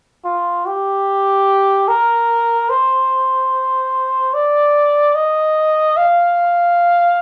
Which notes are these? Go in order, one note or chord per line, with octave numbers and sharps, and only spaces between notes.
F4
G4
A#4
C5
D5
D#5
F5